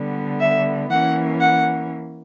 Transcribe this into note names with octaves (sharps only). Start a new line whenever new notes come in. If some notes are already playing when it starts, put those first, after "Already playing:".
Already playing: D3 G3 B3
E5
E3 A#3 C#4 F#5
F#5